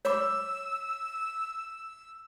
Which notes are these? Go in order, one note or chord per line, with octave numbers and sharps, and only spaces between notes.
C#5 D6 E6